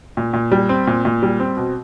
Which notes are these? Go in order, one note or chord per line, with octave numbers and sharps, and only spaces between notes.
A#2
A#2
G3
C4
A#2
A#2
G3
C4
B2